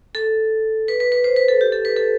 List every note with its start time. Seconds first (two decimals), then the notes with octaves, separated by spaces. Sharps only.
0.15 A4
0.88 B4
1.00 B4
1.12 B4
1.24 C5
1.36 B4
1.48 A4
1.61 G4
1.72 A4
1.85 B4
1.96 A4